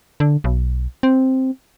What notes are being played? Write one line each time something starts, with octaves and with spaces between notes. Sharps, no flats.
D3
B1
C4